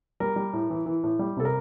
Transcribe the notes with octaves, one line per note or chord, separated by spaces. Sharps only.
G3 A#4
G3
A2
E3
E3
A2
G3
C3 A4
A#4